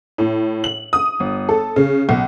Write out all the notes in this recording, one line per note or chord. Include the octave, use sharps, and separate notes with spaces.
A2
F#7
D#6
G1
A4
C#3
B1